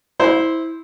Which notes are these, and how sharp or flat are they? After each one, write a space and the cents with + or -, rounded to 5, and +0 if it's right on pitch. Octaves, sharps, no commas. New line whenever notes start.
E4 -15 C5 +0